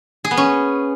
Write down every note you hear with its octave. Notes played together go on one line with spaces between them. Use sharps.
G#4
B3
C#4